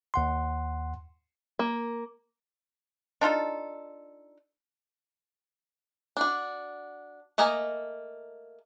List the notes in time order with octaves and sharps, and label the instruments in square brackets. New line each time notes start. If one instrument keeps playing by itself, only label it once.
[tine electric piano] D#2 F#5 C6
[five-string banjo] A#3
[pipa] D4 D#4 F4 A4
[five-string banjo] D4 F#4
A3 A#3 D#5 G#5 A#5